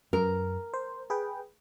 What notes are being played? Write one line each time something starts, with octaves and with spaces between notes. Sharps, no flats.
F#2 A#4
C5
G#4 B4 G5